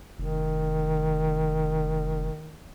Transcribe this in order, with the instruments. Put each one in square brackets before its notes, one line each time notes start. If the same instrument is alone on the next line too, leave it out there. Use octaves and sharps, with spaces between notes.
[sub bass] F1 [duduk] D#3